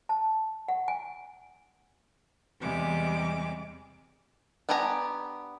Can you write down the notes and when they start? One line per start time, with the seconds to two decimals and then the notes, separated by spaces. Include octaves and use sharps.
0.09 A5
0.68 F#5
0.88 G#5
2.60 E2 C3 G3 G#3 D6
4.69 B3 D4 G4 G#5 A#5